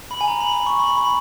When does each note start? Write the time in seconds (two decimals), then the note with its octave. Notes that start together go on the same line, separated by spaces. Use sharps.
0.11 B5
0.21 G#5
0.28 A#5
0.41 B5
0.53 B5
0.66 C#6
0.79 B5
0.97 B5